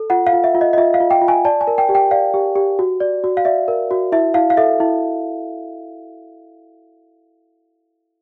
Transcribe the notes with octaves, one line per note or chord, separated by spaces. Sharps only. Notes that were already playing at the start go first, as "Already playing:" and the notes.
Already playing: A4
F4 F#5
F5
F4
E5
F4
D#5
D#5
F4 E5
F5
F4
G5
F4
G#5
D5 A5
G#5
A#4
G5
G4
G5
D5 F5
G4
G4
F#4
D5
F#4
F5
D5 E5
A#4
F#4
E4 E5
E4 F5
F5
A4 E5
E4